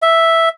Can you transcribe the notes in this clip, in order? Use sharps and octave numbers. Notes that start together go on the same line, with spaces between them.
E5